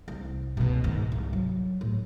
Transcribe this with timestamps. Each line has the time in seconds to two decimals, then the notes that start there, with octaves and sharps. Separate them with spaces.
0.08 C2
0.57 C#2 B2
0.84 G#2 D#3
1.12 C2
1.33 F#3
1.81 A2